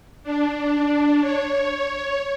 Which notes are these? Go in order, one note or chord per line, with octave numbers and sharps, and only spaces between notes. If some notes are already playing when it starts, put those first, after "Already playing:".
D4
C#5